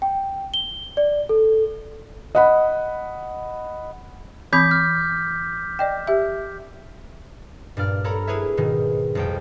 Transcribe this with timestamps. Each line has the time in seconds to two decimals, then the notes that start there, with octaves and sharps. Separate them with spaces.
0.02 G5
0.54 G7
0.97 D5
1.29 A4
2.35 D#5 F#5 B5
4.53 E3 C4 B5 D6 G6 B6
4.71 F6
5.79 D5 D#5 G5
6.07 G4 E5
7.77 G2 A#2 D5 F6
8.04 A4 A#4 C#5 A#5 B5
8.27 E4 G#4 B4 C#5 E5
8.57 G#2 B2 D#3
9.15 C2 F2 G5